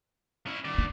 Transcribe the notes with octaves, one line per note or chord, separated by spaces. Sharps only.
C#4 E4
D#3 D5
D4